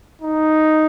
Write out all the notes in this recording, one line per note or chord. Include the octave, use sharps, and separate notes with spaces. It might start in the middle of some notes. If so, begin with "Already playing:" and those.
D#4